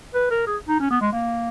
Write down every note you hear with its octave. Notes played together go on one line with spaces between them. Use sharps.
B4
A#4
G#4
D#4
C#4
B3
G#3
A#3